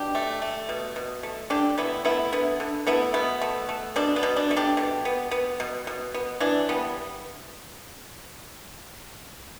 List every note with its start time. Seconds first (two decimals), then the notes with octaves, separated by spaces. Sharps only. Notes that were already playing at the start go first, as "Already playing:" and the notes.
Already playing: B2 D4 G4
0.15 A3
0.42 A3
0.69 B2
0.96 B2
1.23 A3
1.50 D3 D4 G4
1.78 A3 B3 E4
2.04 A3 B3 E4
2.32 D3 B3
2.60 D3
2.87 A3 B3 E4
3.14 B2 B3
3.41 A3
3.69 A3
3.96 B2 D4
4.16 B3
4.23 B2
4.37 D4
4.51 A3
4.56 D4 G4
4.77 B2
5.05 B3
5.31 B3
5.60 B2
5.87 B2
6.14 B3
6.40 E3 D4
6.69 G3 B3